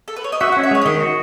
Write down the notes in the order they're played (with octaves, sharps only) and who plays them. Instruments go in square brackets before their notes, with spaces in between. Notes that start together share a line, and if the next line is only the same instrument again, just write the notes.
[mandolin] A4
B4
C#5
D#5
[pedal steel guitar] F#4 [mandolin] E5
[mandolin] F#5
[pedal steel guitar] C#4
[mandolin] E5
[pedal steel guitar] G#3 [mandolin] C#5
[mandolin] C#5
[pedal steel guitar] D#3 [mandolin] D#5
[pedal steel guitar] F#4